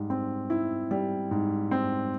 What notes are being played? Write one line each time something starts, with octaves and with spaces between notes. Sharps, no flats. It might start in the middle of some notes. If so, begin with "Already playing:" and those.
Already playing: G#2 G3
C4
E4
G3
G#2
C4